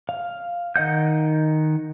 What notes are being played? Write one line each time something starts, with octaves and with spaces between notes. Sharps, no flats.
F5
D#3 D#5 F#5 G6